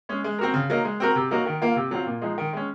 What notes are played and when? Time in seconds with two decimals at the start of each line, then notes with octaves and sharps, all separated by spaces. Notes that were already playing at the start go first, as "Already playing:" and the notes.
0.09 G#3 C#4 G#4
0.24 G#3
0.39 C4 F#4 A#4
0.54 C#3
0.70 F#3 A#3 D#4 A#4
0.85 G#3
1.00 C4 F#4 A#4
1.16 C3
1.31 F#3 A#3 D#4 F#4
1.46 D#3
1.62 A#3 F4
1.76 C3
1.91 F#3 C4 F4
2.07 A#2
2.22 F3 G#3 D#4
2.38 D#3
2.53 G#3 C#4